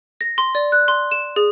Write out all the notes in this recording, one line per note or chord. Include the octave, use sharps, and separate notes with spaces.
A#6
C6
D5
F#6
C6
E7
G#4